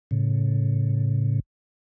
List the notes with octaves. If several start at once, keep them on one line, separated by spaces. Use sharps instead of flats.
A2 C#3